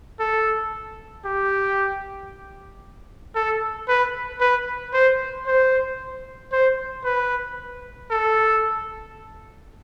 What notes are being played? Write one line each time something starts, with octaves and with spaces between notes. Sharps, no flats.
A4
G4
A4
B4
B4
C5
C5
C5
B4
A4